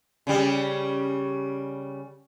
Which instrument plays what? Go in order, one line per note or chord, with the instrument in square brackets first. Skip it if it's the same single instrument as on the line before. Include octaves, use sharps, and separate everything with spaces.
[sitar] C#3 G3